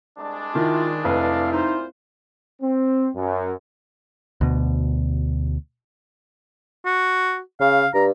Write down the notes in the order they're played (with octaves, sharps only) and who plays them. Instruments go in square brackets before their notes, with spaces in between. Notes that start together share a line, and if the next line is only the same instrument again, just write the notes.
[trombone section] C2 G#3 D4
[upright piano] D#3 [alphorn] E4 [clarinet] F4
[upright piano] F1 B4 [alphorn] E4 [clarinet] F5
[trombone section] A#2 F4 C5 [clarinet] D#4
[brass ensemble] C4
F#2
[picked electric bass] D2 B2
[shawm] F#4
[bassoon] C#3 [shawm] F5
[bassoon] G2 [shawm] A#5